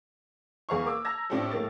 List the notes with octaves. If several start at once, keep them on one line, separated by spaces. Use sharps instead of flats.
E2 G#4 B4 F5 A#5 C#6
A#3 D6 E6
A5 A#5 E6 G#6 A#6
A2 C4 D4 F4 G4 A4
A2 G#3 A#3 A6